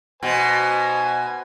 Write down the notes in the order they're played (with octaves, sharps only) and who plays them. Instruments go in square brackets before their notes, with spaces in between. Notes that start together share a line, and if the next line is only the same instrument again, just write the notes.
[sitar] B2 [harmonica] C5 G#5